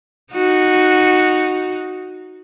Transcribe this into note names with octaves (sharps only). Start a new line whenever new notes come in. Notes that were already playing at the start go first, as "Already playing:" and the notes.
D#4 F#4